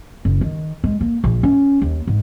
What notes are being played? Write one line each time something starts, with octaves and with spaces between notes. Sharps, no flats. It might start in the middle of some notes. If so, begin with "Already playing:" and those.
F#1
D#3
G#3
A#3
A#1
C#4
D#2
G#2